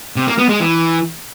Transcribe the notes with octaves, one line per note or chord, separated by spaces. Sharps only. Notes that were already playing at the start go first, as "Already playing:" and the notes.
C3
A#3
B3
G#3
E3